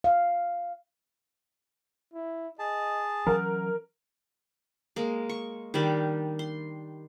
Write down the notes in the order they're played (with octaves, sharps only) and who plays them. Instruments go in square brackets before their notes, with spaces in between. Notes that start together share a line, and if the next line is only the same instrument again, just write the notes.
[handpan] F5
[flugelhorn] E4
[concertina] G#4 A5 [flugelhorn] D#5
[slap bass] E3 F#3 C#4 [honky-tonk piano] A#4 [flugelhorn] F#5
[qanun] G#3 A#3
C#6
D#3 G3 D4 G4
C6